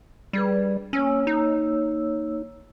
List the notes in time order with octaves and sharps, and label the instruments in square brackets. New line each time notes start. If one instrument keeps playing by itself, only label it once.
[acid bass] G3 [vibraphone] D4 G#4 B4
[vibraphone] A#3 C#5 E6 [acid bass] C#4
[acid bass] D#4